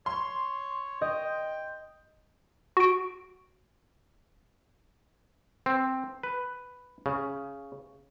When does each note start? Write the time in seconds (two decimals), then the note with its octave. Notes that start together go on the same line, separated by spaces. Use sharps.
0.06 C#5 C6
1.01 D#5 G5
2.77 F#4 D7
5.66 C4
6.23 B4
7.06 C#3